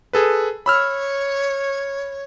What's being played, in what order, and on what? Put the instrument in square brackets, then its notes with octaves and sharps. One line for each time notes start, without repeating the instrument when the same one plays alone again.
[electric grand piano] G#4 A4 B4
[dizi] C#5 [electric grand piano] B5 E6 F6